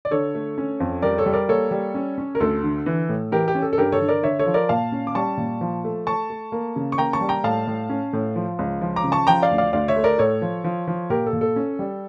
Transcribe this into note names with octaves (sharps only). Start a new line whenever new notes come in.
D5
D3 A4 C#5
A3
C#4
F2
G3 A#4 D5
A4 C#5
G3
A#4 D5
A#3 A4 C#5
G3
C#4
C#4
A#4
D2 A4
D3
E3
A2
E3 G4 A#4
G4
C#4
A4
A4
G2 G4 A#4
A4 C#5
D3
A#4 D5
D3 C#5 E5
A4 C#5
F3
A#4 D5
A#2 F5 A5
C#4
D6
G3 A5 C#6
A#2
F3
A3
A3 A5 C#6
A3
A#3
C#3
C#6
A#3 G5 A#5
A5 C#6
G3
G5 A#5
A2 F5 A5
A2
C#4
A2
F3
C#2
F3
A#5 D6
C#3
A5 C#6
F3 G5 A#5
D5 F5
D2
D5 F5
D2 D5 F5
C#5 E5
A3
A#4 D5
A2 A4 C#5
F3
F3
F3
A#2 G4 A#4
A4
A#2
A4
C#4
G3